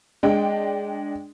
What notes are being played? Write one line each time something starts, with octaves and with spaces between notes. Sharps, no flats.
G#3 D4 G5